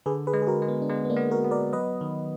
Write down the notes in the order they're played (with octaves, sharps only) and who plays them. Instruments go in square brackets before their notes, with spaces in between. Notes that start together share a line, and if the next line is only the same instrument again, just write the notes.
[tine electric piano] D3 [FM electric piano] G#4 B4
[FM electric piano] G#4 B4
[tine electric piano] G#3
[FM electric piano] G#4
F#4 A#4
[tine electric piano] G#3
[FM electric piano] B3
D4
[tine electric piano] G#3 [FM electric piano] B3
[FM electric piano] B3
A#3 D4
[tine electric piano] B3
[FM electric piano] F#4 A#4
[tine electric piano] B3
[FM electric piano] A#4 D5
[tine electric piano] F#3 [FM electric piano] B4 D#5
[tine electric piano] D#3